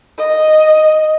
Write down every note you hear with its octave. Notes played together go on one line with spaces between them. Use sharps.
D#5